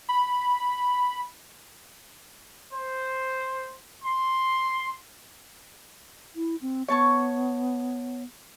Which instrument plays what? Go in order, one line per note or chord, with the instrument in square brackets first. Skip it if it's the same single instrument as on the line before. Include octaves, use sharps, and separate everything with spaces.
[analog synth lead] B5
[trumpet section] C5
C6
[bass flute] E4
C4
[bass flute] B3 [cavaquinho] C#5 A5 C#6